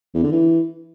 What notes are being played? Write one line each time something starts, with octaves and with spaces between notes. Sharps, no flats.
E2
D3
E3